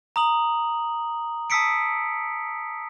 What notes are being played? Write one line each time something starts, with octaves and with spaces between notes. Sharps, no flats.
A#5 D#6 F#7
A5 D#6 E6 B6 C#7 D7